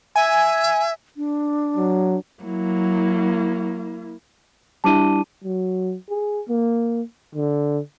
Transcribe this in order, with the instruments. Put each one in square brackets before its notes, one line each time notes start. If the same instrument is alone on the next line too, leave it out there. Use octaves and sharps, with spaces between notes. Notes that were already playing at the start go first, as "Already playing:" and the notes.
[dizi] E5 [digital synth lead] G#5
[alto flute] D4
[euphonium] F#3
[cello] F#3 [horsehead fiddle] A#3 E4
[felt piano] G3 D4 E4 [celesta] A5 D6 D#7
[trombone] F#3
G#4
A#3
D3